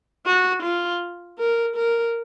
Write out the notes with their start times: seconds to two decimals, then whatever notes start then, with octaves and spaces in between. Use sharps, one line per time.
0.26 F#4
0.63 F4
1.39 A#4
1.76 A#4